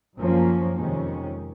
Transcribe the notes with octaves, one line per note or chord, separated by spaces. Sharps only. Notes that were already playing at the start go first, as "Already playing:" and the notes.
F#2 F3 A#3 C#4
F2 C3 D#3 G#3 C#4